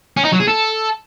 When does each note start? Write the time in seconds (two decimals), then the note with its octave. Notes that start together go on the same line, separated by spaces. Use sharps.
0.17 C#4
0.25 D#4
0.32 F#3
0.40 G#4
0.48 A4